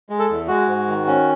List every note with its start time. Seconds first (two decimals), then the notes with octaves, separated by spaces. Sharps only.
0.10 G#3
0.19 A4
0.30 E2
0.48 G#3 F#4
0.68 G#2
0.88 D#3
1.07 C#4